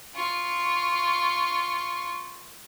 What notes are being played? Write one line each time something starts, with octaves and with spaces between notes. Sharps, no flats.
F4 C#6